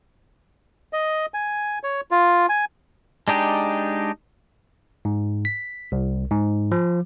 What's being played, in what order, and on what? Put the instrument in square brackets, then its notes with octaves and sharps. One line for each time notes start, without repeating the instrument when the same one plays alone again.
[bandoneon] D#5
G#5
C#5
F4
G#5
[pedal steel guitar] G#3 D4 D#4 G4
[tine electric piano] G#2
B6
C2
G#2
F3